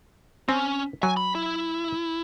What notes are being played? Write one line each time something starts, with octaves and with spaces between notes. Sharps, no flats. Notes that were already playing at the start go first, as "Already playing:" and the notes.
C4 C#4
F#3 G#5
B5
E4